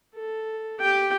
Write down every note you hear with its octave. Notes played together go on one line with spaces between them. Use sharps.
A4
G4 G5